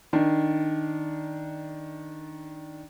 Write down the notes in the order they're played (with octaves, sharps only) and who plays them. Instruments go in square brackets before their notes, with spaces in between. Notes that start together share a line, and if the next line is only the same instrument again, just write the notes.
[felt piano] D#3 D4